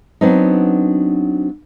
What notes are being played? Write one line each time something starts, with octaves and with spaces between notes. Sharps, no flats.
F#3 B3 C4 D4 D#4